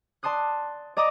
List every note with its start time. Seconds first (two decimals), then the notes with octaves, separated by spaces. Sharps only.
0.23 D5 A5 C6 D#6 F#6
0.97 D5 D#5 A#5 D6 D#6